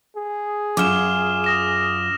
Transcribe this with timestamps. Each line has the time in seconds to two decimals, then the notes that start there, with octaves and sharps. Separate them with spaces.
0.16 G#4
0.77 F#2 F4 D6 F6 E7
1.44 D#6 A#6 E7